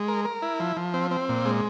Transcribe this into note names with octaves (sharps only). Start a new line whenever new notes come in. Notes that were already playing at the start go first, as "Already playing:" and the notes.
Already playing: G#3
A#4
A#4
E4
F3
F3
C4
C4
A#2
G#3